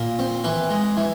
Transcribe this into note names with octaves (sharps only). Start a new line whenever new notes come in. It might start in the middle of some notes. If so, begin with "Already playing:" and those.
Already playing: A#2
C4
E3 B4
G#3
E3